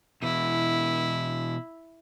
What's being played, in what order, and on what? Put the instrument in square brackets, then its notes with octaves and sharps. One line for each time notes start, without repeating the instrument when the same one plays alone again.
[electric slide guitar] B2 E3 [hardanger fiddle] E4